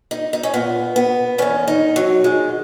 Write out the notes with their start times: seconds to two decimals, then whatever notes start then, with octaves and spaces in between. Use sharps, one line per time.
0.11 D#4
0.33 D#4
0.43 C#4
0.53 A#2 B3
0.96 B3
1.38 E2 D#3 C#4
1.68 D#4
1.96 F#3
2.24 E2 D#3 G#3